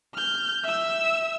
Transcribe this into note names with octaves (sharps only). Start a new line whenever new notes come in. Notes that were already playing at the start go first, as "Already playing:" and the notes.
F6 G6
E5 E6